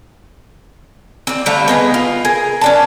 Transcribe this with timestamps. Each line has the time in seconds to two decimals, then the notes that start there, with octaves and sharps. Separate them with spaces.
1.27 C4 D5
1.46 D3 G3 A3 F5
1.68 B3 D#4 G#4
1.94 F4
2.25 G#4 A#4
2.61 C#4 D4 A5